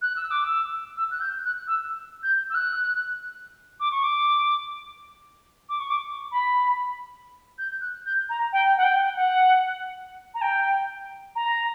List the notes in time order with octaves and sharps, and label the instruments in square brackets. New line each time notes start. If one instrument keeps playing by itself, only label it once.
[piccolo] F#6
E6
D6
E6
E6
F#6
G6
F#6
E6
G6
E6
F#6
D6
C#6
D6
D6
C#6
D6
B5
G6
F#6
G6
A#5
G5
F#5
G5
F#5
A#5
G5
A#5